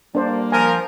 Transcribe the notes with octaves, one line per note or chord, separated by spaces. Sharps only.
G3 A#3 D4 C5 D5
F3 A#4 G#5